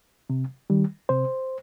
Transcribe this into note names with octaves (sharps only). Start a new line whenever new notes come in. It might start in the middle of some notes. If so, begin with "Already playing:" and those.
C3
D#3 G3
C3 C5